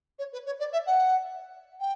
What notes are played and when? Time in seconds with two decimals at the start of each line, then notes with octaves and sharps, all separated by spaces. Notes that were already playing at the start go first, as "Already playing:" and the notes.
0.19 C#5
0.33 B4
0.46 C#5
0.60 D5
0.73 E5
0.86 F#5
1.80 G5